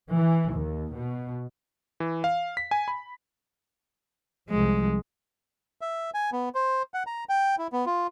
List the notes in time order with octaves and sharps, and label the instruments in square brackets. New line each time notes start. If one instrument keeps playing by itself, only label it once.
[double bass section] E3
D#2
B2
[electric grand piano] E3
F5
B6
G#5
B5
[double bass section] C2 F3 [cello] G#3
[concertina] E5
G#5
B3
C5
F#5
A#5
G5
E4
B3
F4